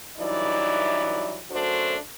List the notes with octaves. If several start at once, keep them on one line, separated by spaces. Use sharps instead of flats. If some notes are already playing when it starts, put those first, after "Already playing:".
G2 E3 F#3 D#4 E4 D5
F#2 A3 D4 F#4 A4 C5